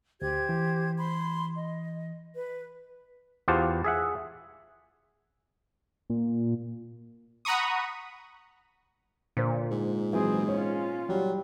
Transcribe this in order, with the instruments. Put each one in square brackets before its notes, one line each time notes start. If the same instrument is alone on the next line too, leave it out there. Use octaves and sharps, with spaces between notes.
[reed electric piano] D2 [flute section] G4 C5 G#6
[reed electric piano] E3
[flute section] B5 C6
D#5
B4
[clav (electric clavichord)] E2 F4 G4 C5 F#5 A5
G#4 E5 F#5
[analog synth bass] A#2
[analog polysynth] F#5 A#5 B5 C#6 D#6
[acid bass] A#2 [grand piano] D3 C5
[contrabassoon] G#2
[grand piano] E3 F#3 G#3 [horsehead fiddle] C4 G#4
[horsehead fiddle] C#4 F4 [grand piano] C#5
[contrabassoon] F#3 [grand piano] G3 E4